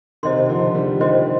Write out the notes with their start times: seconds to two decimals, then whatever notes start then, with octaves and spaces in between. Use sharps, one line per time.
0.23 C3 D#3 C5 D#5 G5 C6
0.48 D3 F3
0.75 D#3 G3
1.00 D#3 G3 C5 D#5 G5 C6